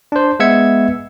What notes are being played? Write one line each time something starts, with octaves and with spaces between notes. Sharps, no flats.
D4 C5
G#3 B3 E5 E6 G#6 C#7